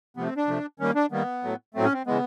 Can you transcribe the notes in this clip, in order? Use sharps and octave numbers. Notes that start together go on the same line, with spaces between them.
C3 F3 A3 B3
C4
D4
C3 F3 A3
D#3 G3 A#3 C#4
D4
D#3 G3 A#3 B3
A2 F#3 A3
A2 F#3 A3 C4
C#4
C4
C#3 E3 G#3 B3